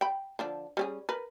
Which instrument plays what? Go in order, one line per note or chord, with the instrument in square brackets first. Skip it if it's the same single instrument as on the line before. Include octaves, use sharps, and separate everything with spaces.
[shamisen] G5 B5
D3 F3 D4
G3 C#4 G#4
A#4 B4